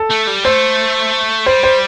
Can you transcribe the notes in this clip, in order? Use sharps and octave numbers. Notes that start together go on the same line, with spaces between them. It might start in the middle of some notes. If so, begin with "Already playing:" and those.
Already playing: A4
A3
G3
A3 C5
G3 C5
C5